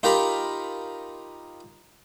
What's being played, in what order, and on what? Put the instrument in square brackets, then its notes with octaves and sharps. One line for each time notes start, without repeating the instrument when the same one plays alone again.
[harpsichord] D#4 F4 G4 A#4 A#5 B5